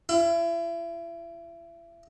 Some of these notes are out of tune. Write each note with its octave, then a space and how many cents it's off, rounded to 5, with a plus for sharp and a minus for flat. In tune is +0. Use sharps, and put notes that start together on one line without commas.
E4 +35